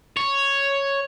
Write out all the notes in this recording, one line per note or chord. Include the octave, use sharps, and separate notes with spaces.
C#5